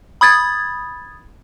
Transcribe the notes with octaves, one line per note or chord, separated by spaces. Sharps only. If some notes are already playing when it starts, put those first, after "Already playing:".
B5 D#6 G#6 A6